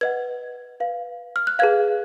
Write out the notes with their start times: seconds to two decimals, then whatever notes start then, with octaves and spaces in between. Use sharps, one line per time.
0.01 B4 D#5 F#5 G#6
0.80 B4 F5
1.36 F6
1.47 F#6
1.59 G#4 B4 F5 G#6